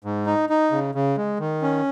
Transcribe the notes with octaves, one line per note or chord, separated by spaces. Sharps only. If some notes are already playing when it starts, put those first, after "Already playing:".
G#2
D#4
D#4
C#3
C#3
G#3
D#3
C#4